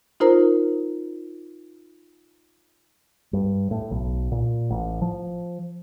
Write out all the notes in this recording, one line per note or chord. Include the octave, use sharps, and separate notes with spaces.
D#4 F4 A#4 C5 A#5
G2
A2
B1
A#2
A1
F3